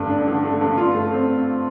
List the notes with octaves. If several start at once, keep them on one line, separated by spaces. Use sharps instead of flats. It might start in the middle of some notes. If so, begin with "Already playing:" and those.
Already playing: G2 D3 A3
D4
D3
A3
G2
F4
A3
C4